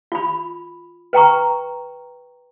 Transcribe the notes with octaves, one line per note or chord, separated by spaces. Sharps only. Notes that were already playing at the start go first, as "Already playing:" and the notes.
F4 B5
B4 G5 A#5 C#6